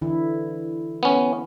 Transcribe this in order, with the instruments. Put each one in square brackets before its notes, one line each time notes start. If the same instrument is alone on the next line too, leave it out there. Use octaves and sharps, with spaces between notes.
[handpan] D3 E3 E4
[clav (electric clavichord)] B3 C#4